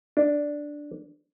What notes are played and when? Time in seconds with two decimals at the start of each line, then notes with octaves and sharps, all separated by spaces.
0.17 D4